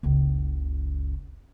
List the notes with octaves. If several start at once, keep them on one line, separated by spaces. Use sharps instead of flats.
F#1 C#2